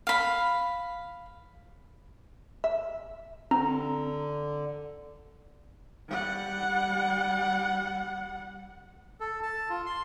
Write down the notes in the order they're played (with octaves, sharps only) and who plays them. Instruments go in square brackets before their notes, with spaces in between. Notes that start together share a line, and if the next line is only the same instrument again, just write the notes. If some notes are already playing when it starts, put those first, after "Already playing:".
[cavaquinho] F5 B5
[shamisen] E5
[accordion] D3 [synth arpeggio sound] C4 [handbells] A#5
[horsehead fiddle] G3 F#5
[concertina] A4
A5
F4
C6